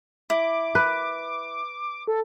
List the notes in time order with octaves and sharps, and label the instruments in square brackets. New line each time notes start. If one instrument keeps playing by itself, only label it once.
[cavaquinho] E4 [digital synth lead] D6
[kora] B4
[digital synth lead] A4